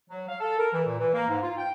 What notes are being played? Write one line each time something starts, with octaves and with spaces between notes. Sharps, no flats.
F#3
F5
A4
A#4
E3
A#2
E3
A#3
G#2
F4
G5